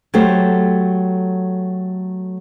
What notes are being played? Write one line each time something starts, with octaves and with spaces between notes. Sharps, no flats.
F#3 A3 G4 C5